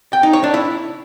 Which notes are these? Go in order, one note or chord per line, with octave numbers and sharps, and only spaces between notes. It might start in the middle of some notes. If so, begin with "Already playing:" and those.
G5
D#4
C#5
D4
E4